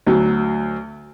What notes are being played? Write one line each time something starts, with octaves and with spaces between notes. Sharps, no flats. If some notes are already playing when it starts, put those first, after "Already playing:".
D2 F#3